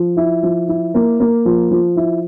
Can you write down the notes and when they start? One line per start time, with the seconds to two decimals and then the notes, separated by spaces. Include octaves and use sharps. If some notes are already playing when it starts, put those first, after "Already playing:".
Already playing: F3
0.17 E4
0.43 F3
0.68 E4
0.94 A#3
1.20 A#3
1.45 F3
1.71 F3
1.96 E4